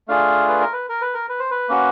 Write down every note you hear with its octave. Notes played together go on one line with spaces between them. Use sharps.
A3 D4 F4 G#4 F5
B4
A#4
B4
A#4
B4
A#4
B4
C5
B4
A#3 C#4 F#4